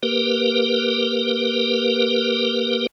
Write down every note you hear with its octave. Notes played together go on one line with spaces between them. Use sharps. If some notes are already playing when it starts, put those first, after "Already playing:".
A#3 G4 A#4 B4